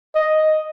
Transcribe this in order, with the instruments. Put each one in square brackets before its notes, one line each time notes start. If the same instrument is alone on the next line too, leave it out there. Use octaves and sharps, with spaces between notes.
[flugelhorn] D#5